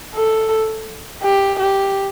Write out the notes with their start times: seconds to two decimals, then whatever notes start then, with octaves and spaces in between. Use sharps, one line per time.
0.15 A4
1.23 G4
1.60 G4